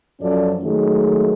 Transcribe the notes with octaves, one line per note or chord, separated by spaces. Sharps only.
F#2 F3 C#4 A4 D5
D#3 F#3 G#3 A3